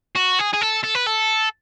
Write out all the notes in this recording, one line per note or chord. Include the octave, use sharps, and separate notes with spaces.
F#4
G#4
G#4
A4
A4
B4
A4